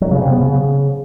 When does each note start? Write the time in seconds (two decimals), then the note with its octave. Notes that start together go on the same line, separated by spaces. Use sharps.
0.01 F#3
0.11 C#3
0.21 C3
0.31 B3
0.41 C#3